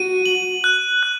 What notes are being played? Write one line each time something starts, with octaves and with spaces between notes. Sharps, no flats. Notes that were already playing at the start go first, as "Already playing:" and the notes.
Already playing: F#4 D#7
F#7
F#6
F#6